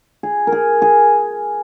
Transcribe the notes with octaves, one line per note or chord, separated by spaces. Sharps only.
G#4
A#4
G#4
G#4